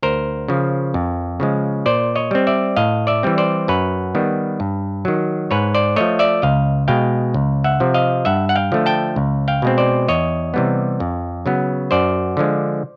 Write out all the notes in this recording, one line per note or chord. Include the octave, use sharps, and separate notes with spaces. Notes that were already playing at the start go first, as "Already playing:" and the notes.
D2 A#4 C5
C#3 F3
F2
C#3 F3 G#3
A#2 C5 D5
C#5 D#5
G3 C4
D5 E5
A2 D#5 F5
D5 E5
E3 G3 C4
C5 D5
F#2 B4 C#5
D#3 G3 B3
G2
D#3 F#3
G#2 B4 C#5
C5 D5
F3 A3 C#5 D#5
D5 E5
C#2 D#5 F5
B2 G#3 F5 G5
C#2
E5 F#5
C3 F3
D#5 F5
G2 E5 F#5
F#5
F5 G5
D3 F3 A3
G5 A5
C#2
F5 G5
B2 G#3 C4
C5 D5
E2 C#5 D#5
C3 E3 G3 B3
F2
C#3 F#3 B3
F#2 C5 D5
D3 F3 G#3